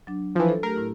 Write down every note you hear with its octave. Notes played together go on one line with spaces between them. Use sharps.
F#3 D4
E3 F3
A4
A3 G4 A#4
A2 E4